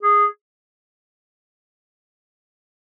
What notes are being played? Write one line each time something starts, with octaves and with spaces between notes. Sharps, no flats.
G#4